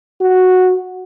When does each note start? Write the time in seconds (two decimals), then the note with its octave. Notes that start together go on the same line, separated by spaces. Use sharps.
0.21 F#4